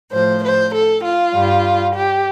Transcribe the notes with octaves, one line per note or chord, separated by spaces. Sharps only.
A2 F3 C5
C5
A4
F4
G2 G3
G4